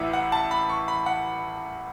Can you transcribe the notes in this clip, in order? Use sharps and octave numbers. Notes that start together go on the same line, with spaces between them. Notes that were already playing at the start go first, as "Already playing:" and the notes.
Already playing: A1 A2 E3 E5 F#5
F#5
A5
B5
C#6
B5
F#5